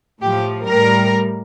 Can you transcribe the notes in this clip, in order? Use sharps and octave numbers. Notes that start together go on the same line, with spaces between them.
A2 F3 G4
A2 G3 A#4